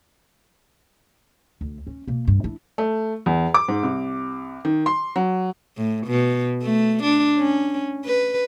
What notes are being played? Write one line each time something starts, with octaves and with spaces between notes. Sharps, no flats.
D2
C#4
B2 A#3
G2
D4 E4
A3
E2
D6
G#2
C2
D#3
C6
F#3
A2
B2
A3
D4
C#4
B4